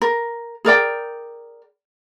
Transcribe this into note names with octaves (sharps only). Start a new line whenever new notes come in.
A#4
G#4 A#4 D5 G5